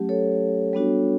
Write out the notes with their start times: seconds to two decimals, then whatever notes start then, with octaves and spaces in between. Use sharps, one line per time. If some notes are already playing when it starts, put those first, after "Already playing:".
Already playing: F#3 A3 C#4 G4
0.09 A4 C#5
0.73 G3 B3 D4 F#4